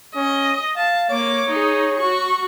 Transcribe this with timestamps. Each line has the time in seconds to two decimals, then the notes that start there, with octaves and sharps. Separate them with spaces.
0.16 C#4 D#5
0.76 F5 A5
1.10 A#3 C#5 D6
1.50 D#4 G#4
1.98 F#4 C#6